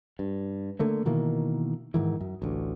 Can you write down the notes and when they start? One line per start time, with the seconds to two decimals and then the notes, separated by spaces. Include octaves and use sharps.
0.19 G2
0.79 D3 A3 A#3
1.06 B2 D#3 E3 A#3
1.94 G#2 D#3 E3
2.21 F#2
2.42 A1 D2